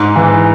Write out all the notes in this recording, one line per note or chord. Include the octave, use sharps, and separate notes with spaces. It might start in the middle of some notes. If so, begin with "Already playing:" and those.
Already playing: G#2
E3